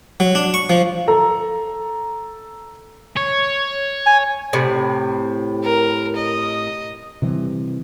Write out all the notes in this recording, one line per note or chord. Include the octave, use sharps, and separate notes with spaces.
F#3
D4
C#6
F3
A4 A#5
C#5
G#5
A2 C3
A#4
D#5
C3 E3 G3